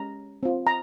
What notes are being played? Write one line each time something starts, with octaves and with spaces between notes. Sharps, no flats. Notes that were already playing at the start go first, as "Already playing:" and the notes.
Already playing: G#3 C#4 G4 A#5
C4 F4
A#5